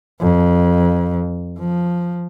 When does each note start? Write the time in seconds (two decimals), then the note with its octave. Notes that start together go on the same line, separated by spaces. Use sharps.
0.20 F2
1.59 F3